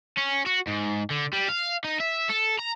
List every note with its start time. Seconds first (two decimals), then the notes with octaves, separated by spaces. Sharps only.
0.17 C#4
0.46 F#4
0.67 G#2
1.11 D3
1.33 G3
1.49 F5
1.84 D#4
2.00 E5
2.29 A4
2.59 A#5